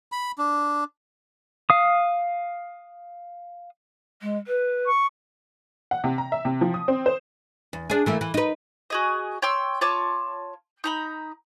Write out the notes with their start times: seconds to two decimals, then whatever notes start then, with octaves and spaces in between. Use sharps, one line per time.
0.12 B5
0.38 D4
1.70 F5 D#6
4.20 G#3
4.47 B4
4.86 C#6
5.91 F#5
6.04 C3
6.18 A#5
6.32 E5
6.45 C3
6.61 F3
6.74 D#6
6.88 C4
7.06 C5
7.73 E2
7.90 D4 G#4
8.06 E3 A3 A#3
8.21 E3
8.34 D#4 B4
8.90 F#4 G#4 D#5
9.42 C#5 G5 C6 E6
9.81 F4 C#5 A5 D6
10.84 D#4 A#5 B5